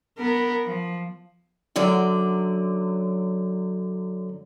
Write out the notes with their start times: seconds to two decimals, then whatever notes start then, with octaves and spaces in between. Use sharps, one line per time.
0.18 B3 A#4
0.65 F3
1.76 F#2 D3 F#3 D5